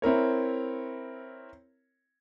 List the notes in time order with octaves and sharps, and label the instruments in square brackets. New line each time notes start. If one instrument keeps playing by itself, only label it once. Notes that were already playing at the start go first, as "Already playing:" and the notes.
[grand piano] C4 E4 A#4 C#5